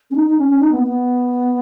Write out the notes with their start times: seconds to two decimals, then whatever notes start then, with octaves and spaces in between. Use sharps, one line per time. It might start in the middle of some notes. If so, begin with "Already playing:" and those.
0.10 C#4
0.15 D#4
0.27 D#4
0.38 C#4
0.48 C#4
0.59 D#4
0.71 B3
0.83 B3